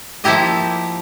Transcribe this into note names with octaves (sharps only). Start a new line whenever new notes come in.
F3 A#3 E4 G4 D#5